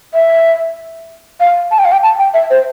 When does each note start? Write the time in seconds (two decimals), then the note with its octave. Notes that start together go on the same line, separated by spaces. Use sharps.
0.14 E5
1.40 F5
1.71 A5
1.79 G5
1.85 F5
1.92 G5
2.03 A5
2.19 G5
2.34 E5
2.50 C5